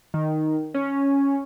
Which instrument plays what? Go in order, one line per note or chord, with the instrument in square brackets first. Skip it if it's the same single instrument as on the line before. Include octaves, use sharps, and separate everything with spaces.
[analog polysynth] D#3
C#4